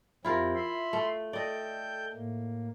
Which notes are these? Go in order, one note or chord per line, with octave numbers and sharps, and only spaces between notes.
F2 C4 E4 F4 G4 A#4
E5 B5 C6
A3
A4 D5 D#5 G5 G6
A2 A#3